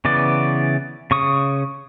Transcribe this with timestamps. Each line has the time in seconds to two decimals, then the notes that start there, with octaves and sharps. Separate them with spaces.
0.05 C#3 E3 B3 D5
1.11 C#3 C#6 D#6